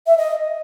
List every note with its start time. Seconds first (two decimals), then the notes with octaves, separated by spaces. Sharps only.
0.07 E5
0.18 D#5